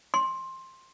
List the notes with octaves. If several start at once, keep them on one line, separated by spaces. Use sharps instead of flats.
C6